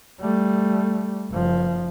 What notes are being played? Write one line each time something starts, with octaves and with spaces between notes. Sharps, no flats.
G3 A3
F#1 F3